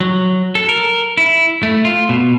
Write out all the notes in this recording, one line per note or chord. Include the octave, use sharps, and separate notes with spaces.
F#3
A4
A#4
E4
A3
F4
B2